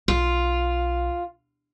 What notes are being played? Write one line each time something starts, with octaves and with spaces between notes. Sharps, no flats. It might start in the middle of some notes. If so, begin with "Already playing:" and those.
B1 F4